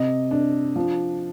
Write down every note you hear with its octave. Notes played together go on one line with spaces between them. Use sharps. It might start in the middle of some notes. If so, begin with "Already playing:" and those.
Already playing: C3 D#5
D4
F3